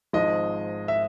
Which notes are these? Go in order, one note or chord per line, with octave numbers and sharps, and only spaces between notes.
G#1 G#2 F3 G#3 D#5
E5